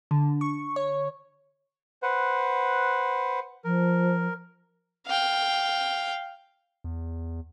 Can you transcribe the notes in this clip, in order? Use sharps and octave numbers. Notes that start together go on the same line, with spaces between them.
D3
C#6
C#5
B4 C5 F#5
F3 A#4
F5 G5
E2